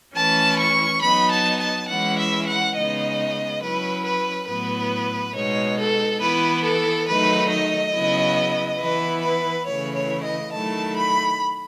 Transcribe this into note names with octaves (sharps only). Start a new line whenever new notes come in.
E3 A3 C#4 E4 A5
C#6
F#3 B3 D#4 B5
A5
A5
E3 G#3 C#4 E4 F#5
E5
F#5
C#3 G#3 B3 D#4 D#5
F#3 C#4 E4 B4
B4
A2 F#3 B3 E4 B4
B2 G#3 D#4 C#5
A4
E3 B3 E4 B4
A4
D#3 F#3 A3 D#4 B4
D#5
C#3 F#3 B3 E4
E3 B3 E4 B4
B4
C#3 E3 A3 E4 C#5
C#5
D#5
D#3 F#3 A3 E4 A5
B5